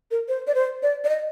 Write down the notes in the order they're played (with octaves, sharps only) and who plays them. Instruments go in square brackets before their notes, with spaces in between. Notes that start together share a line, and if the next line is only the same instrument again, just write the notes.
[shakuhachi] A#4
C5
D5
C5
D5
D5
D#5